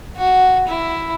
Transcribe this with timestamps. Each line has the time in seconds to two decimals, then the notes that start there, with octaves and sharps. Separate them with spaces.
0.17 F#4
0.67 E4